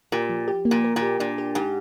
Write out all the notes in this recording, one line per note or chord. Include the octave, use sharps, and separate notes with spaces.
A#2 G4
F3
G4
A#3
A#2
A#4
A#2
G4
A#2 D4
G4
G#2 G4